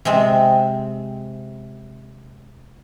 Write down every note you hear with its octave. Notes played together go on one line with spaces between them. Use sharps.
C3 G#3 C4